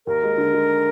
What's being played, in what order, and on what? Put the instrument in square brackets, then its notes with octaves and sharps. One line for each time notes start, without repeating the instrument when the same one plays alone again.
[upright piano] D#2 [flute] A#4
[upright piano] G#3
D3
G#3